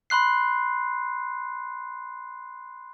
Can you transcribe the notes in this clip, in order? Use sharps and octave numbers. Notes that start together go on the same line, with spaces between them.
B5 C6 F#6 C7